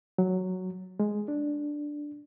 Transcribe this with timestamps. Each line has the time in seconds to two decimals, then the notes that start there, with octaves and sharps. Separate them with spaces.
0.18 F#3
1.00 G#3
1.28 D4